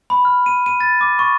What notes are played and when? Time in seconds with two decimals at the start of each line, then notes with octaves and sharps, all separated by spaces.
0.10 B5
0.25 F6
0.46 D#7
0.66 D#7
0.81 A6
1.01 D6
1.19 C#6